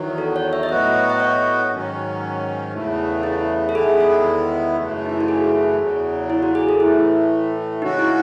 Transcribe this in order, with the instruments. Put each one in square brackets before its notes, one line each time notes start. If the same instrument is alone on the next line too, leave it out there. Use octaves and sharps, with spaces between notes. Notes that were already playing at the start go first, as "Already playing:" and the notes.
Already playing: [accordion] E2 D#3 F#3
[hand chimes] A4
C#5
E5
D#5
[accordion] A2 F#3 B3 F#4 [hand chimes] E5
[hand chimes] D#5
C#5
[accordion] G#2 D#3 F#3 C#4
E2 C#3 E3 A3
[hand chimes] E4
A4
[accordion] E2 D#3 G#3 B3 E4 [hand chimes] G#4
[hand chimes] A4
[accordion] F#2 C#3 E3 A3
[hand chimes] D#4
E4
F#4
G#4
[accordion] E2 C#3 F#3
[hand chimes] E4
F#4
G#4
A4
[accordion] A2 E3 A3 [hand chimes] E4
[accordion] C#3 G#3 C#4 F#4 [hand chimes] D#4
[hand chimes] E4